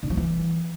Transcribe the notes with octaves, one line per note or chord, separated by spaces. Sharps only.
D3
F3
E3